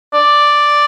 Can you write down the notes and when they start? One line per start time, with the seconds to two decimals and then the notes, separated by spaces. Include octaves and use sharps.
0.14 D5